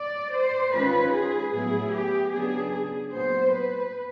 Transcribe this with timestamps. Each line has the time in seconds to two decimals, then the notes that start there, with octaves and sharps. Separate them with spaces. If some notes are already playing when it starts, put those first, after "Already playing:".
Already playing: D5
0.33 C5
0.73 D#3 G#3 C#4 F4 B4
1.13 G#4
1.53 A2 F#3 B3 E4 G#4
1.93 G4
2.32 C#3 F#3 B3 D4 G#4
3.13 A#2 F#3 B3 C5
3.53 B4